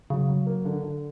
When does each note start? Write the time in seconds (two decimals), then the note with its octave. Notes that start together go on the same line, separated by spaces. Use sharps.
0.10 C#3 F#3
0.28 F#3
0.46 A#3
0.65 D3
0.83 D3